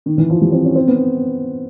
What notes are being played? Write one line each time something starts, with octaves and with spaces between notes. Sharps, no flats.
D#3
E3
F3
G3
C4
C#4
C4
B3